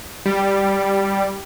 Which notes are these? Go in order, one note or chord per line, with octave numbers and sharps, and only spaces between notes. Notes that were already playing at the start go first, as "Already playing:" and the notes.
G3